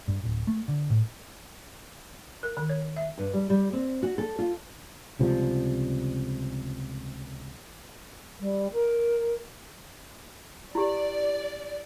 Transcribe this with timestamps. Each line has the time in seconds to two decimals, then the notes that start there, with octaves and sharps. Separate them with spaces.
0.08 G2
0.23 D1
0.47 A3
0.68 D3
0.90 A2
2.43 A#4
2.57 D#3
2.70 C#5
2.96 E5
3.18 G2
3.33 G3
3.50 G3
3.73 C4
4.03 F#4
4.18 A4
4.39 F4
5.19 C#2 C3 F3 G3
8.40 G3
8.73 A#4
10.75 E4 G4 D5